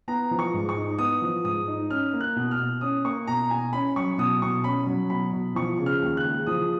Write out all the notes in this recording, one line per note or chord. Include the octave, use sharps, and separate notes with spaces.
B3 A#5
F3
C#6
G#2
C#6
D#4
B3 D#6
F3
G#2 D#6
D#4
C#4 F6
A#3
F#6
B2
F6
B2
C#4 D#6
A#3 C#6
B2 A#5
B2 G#5
C#4 B5
F#3 C#6
B2 D#6
B2 C#6
C#4 B5
F#3
B2 B5
B2
F3 C#6
C#3
F6
D#2
F#6
G#3
F3 D#6